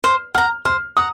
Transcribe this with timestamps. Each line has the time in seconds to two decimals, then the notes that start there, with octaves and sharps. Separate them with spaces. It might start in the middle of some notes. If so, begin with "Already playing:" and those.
0.04 C5 F6
0.34 F#5 A#5 F6
0.65 C5 F6
0.97 F#5 A#5 D#6